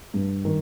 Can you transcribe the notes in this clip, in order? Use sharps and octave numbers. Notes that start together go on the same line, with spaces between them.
G2
D#3